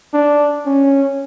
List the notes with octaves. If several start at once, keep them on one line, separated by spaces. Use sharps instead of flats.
D4
C#4